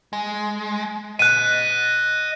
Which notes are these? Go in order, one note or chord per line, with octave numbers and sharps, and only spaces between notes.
G#3
D#5 F#5 F#6 D#7